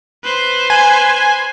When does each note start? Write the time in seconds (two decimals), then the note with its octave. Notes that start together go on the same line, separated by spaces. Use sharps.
0.24 B4 C5
0.70 G#5